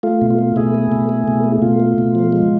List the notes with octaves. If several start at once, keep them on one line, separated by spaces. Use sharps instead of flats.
A3 F4
B2
F4
A3
B2 E4 G#4
A3
B2
A3
B2
A3
B2 F4
A3
B2
F3
G#3